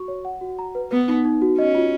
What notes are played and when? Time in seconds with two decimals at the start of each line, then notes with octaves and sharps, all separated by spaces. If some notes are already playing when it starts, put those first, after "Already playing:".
Already playing: F#4 C#6
0.08 C#5
0.25 F#5
0.41 F#4
0.59 A#5
0.75 B4
0.91 B3 B4
1.08 D#4
1.25 D#4
1.42 F#4
1.58 C#4 D#5
1.75 F4